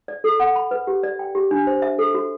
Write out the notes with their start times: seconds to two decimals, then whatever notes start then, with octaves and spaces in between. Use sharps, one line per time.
0.08 D5
0.24 A4
0.40 F#5
0.56 B5
0.71 B4
0.87 G4
1.03 D5
1.19 G5
1.35 G4
1.51 D4
1.67 C5
1.82 E5
1.98 A4
2.15 F#4